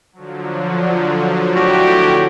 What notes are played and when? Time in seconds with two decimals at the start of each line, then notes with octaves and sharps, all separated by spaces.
0.13 D3 F3 F#3
1.56 A2 F#4 G4